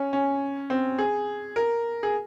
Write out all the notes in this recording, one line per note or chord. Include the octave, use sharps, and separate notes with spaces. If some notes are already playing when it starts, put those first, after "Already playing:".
Already playing: C#4
C#4
C4
G#4
A#4
G#4